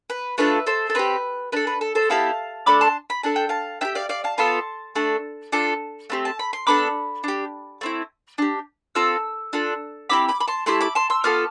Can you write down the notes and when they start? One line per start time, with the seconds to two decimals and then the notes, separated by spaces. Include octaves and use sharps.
0.10 B4
0.38 A3 D4 F4 A4 B4
0.67 A4 C5
0.90 A4
0.95 C4 G4 B4
1.52 D4 A4 B4
1.67 B4
1.81 A4
1.95 A4 C5
2.09 B3 E4 G4 F5 A5
2.66 A3 D4 A4 B5 D6
2.81 A5 C6
3.10 B5
3.23 D4 A4 A5
3.36 G5
3.49 F5 A5
3.81 D4 E5 G5
3.85 G4
3.95 D5 F5
4.09 D5 F5
4.24 F5 A5
4.38 B3 F4 A4 A5 C6
4.95 A3 D4 A4
5.52 D4 F4 A4
6.10 A3 C4 G4
6.25 A5
6.39 B5
6.53 C6
6.67 B3 D4 A4 B5 D6
7.24 D4 G4
7.81 A3 C4 E4
8.38 D4 G4
8.95 C4 F4 A4 E6
9.53 D4 F4 A4
10.10 C4 E4 G4 B5 D6
10.28 B5 D6
10.40 B5
10.48 A5 C6
10.66 A3 E4 G4 A5 C6
10.81 B5 D6
10.95 A5 C6
11.10 C6 E6
11.24 B3 F4 A4 D6 F6